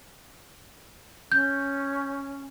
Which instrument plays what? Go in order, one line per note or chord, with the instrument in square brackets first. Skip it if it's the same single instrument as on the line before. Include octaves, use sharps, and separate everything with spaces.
[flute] C#4 [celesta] G6